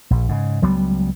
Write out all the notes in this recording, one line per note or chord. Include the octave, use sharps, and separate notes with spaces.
A#1
G#2 C#3
C#2 F#3 G3 B3